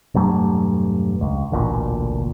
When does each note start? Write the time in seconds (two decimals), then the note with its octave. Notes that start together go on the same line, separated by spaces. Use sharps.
0.15 E1 G2 F#3 A3
1.21 C#2
1.52 E1 A1 D2 A#2